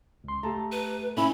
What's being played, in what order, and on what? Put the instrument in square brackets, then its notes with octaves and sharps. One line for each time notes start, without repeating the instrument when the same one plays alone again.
[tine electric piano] C#2 C6
[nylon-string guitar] A3 [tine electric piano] G4 A5 A#5
[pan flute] B4
[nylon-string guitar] C#4 E4 [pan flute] B5